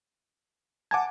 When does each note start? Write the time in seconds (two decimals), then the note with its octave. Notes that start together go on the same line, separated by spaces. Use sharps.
0.91 F#5 G#5 A5 D6 G#6